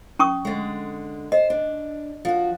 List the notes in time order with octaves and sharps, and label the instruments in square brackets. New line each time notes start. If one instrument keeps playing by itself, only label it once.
[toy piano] C#4 C#6 D#6
[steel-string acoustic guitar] D3 G#3
[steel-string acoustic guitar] C5 [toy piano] D#5
[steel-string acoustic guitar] D4
F3 F#4